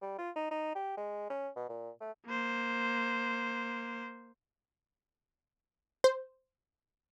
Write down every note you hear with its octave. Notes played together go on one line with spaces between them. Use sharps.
G3
F4
D#4
D#4
G4
G#3
C#4
B2
A#2
A3
A#3 C5
C5